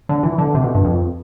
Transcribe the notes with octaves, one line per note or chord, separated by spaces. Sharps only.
D3
E3
D3
C3
B2
G2
F2